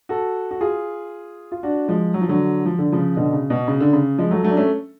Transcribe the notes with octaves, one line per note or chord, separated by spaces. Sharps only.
F#4 A4
F#4
F4 G#4
F4
D4 F#4
F3 G#3
F#3
F3
D3 F#3
F3
D3
C#3 F3
B2 D3
C#3
B2
C#3
D3
C#3
F3 G#3
F#3 A3
F#3 A3
D4
A3 C#4